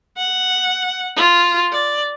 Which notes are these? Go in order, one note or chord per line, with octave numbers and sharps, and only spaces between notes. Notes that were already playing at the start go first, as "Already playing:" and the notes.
F#5
F4
D5